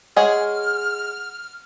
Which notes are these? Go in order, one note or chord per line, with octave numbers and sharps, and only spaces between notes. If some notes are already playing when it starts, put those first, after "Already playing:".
G#3 G#4 C#5 F#5 F6